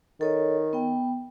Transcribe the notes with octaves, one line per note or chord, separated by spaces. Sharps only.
D#3 A4 C#5 D#5
B3 G5